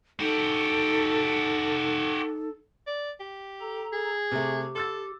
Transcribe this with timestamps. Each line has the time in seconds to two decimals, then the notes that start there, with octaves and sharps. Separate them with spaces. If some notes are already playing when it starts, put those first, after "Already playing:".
0.20 D#4 F#4 G4 A4
2.87 D5
3.20 G4
3.61 A4 A#5
3.93 G#4
4.32 C3 A3 G4
4.75 A4 C6 E6 A6